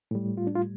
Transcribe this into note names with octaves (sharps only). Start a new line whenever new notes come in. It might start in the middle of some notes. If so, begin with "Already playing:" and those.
A2 G3
F4
D4
F4